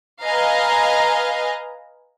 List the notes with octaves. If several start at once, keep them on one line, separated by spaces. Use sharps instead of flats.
B4 D#5 F5 G#5 A#5